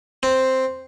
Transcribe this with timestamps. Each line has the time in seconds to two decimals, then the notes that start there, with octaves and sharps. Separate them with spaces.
0.23 C4